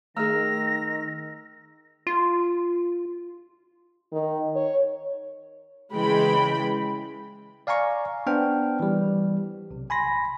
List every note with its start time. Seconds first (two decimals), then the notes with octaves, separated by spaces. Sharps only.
0.17 D#3 A3 G#4 A#5 E6 F6 A#6
2.07 F4
4.12 D#3
4.56 C#5
5.93 C#3 E3 G#3 G5 B5
7.67 D5 F5 G#5 A#5 C#6
8.26 B3 D4 C5 G5 F6
8.80 E3 G3
9.71 B1 C3
9.90 G#5 B5 C6 A#6